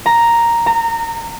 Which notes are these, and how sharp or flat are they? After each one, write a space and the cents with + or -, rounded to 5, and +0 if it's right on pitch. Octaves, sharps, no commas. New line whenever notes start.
A#5 +0
A#5 -25